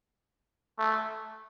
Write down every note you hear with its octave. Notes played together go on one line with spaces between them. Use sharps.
A3